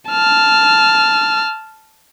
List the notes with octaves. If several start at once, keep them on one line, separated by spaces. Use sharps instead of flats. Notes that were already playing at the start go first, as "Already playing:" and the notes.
A5 F6